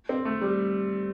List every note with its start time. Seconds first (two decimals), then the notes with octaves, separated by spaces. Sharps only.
0.09 C4
0.25 A3
0.41 G3